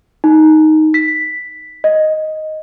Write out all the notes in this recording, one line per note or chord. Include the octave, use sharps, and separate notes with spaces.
D#4
B6
D#5